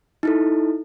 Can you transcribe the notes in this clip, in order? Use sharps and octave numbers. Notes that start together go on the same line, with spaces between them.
D#4 E4 A4